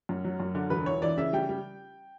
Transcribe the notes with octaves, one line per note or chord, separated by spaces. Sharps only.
F#2
F#3
F#2
D3
E1 B4
E3 C#5
E3 D5
C#3 E5
G3 G5
G3